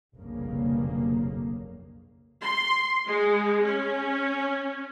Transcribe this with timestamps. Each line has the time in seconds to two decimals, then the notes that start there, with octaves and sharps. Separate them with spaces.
0.15 F1 B1 G2 C#3 A#3
2.42 C6
3.06 G#3
3.64 C#4